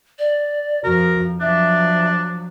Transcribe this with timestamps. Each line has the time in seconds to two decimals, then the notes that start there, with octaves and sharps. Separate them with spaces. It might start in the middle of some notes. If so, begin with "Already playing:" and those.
0.19 D5
0.84 F2 F3 F#4 A#4
1.41 F3 F#3 D4 E5